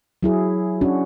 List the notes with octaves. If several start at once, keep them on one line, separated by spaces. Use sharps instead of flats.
F#3 E4 G#4
C#4 D4 F#4